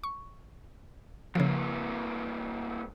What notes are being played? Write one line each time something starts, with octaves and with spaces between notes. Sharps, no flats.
C#6
G2 C#3 F3 A#3